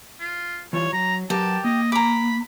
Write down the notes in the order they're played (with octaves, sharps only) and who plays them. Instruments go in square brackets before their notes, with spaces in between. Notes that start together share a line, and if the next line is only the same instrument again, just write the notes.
[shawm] F4
[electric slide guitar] E3 G3 F4 [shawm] C#5
[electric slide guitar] F#3 [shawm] A#5
[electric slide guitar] F#3 A#4 B4 [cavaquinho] G4 [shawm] A5
[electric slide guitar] A#3 [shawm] D#5
[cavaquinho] A#5 D6 [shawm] B5